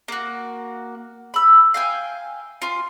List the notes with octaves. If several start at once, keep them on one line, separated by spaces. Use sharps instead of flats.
A#3 F#4
B5 E6
F5 G5 G#5
F4 G#5 C6